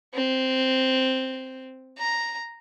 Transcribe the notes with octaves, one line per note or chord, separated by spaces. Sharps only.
C4
A#5